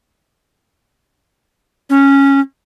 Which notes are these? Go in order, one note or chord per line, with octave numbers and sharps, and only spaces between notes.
C#4